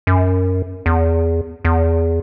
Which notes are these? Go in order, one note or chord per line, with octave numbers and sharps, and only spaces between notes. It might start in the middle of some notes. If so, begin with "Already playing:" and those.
F#2
E2
E2